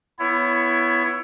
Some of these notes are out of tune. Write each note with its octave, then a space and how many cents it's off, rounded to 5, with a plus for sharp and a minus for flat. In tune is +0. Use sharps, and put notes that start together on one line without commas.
B3 +0 E4 +20 C#5 +10